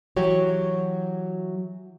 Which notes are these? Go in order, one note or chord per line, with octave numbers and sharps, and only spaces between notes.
E3 F#3 F#4 G4 C#5